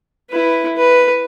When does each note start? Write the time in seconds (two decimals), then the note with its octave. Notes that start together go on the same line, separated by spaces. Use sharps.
0.31 E4 B4
0.77 B4